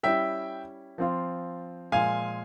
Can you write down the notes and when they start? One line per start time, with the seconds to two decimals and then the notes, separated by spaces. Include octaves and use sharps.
0.03 G3 C#4 E4 E5 G5
0.98 F3 C4 F4
1.92 A#2 F3 G#3 F5 G#5